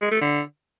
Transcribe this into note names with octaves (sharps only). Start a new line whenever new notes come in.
G#3
A3
D3